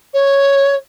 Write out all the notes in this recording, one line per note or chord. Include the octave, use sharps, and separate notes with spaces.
C#5